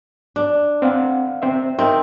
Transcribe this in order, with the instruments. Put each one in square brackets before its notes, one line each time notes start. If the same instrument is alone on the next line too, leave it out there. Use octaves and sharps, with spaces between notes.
[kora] D4
[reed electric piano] C4 F5 F#5
C4 C5 E5
[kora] C4 [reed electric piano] D#4 A#4 E5